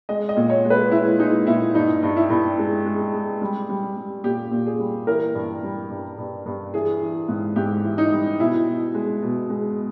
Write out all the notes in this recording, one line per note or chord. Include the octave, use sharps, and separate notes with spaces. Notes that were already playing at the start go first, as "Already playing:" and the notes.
G#3 D#5
D#5
A#2
C#5
G#3
B4
G#3 E4
G#3 D#4
A#2 E4
G2 D#4
G2
E4
G2
G#3
G#3
G#3
G3
G3
G3
A#2 G4
A#2
G#4
G3
E3 A#4
G2
G3
G2
G2
G2
E3 G#4
E3
G#2
G#2 G4
E3
D#4
G3
B2 E4
B2
G#3
B2
G#3